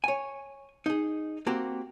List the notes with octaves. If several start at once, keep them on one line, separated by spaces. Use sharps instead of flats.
C#5 G#5
D#4 G#4
A#3 C4 F#4 G4